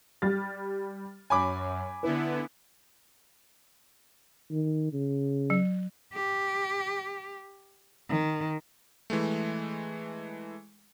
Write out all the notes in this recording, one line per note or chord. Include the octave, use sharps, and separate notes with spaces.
G3 F6 A6
F#2 C#5 G#5 B5 D6
D3 B3 E4 B4
D#3
C#3
F#3
G4
D#3
E3 G#3 A3